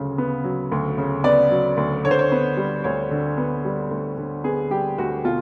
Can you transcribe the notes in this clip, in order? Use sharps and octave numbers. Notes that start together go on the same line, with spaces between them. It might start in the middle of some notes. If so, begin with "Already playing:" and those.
Already playing: D2 C#3 F#3
B3
F#3
D2
C#3
B3 D5
F#3
D2
D3 C#5
C5
C#5
B3
G3
D2 C#5
D3
B3
G3
D2
D3
B3 G#4
G3 G4
D2 F#4
B2 F4